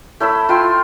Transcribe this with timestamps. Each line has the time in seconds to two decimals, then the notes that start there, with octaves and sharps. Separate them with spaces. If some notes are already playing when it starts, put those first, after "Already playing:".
0.20 A3 E4 B5 E6
0.49 F4 G5 C6